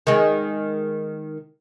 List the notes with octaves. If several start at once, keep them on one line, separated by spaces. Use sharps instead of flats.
D#3 G#3